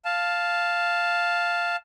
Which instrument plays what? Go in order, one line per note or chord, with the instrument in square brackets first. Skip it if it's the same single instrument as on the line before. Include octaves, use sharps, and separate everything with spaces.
[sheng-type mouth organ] F5 A5